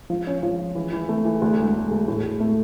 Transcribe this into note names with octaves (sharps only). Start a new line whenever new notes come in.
F3
C#4
F3
F4
E3
E3
A3
E3
D2
E1
E1
D2
A2
A2
A3